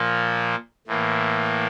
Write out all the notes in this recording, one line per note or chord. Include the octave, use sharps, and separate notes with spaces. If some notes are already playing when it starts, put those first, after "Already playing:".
Already playing: A#2 F3 A#3
A2 E3 A#3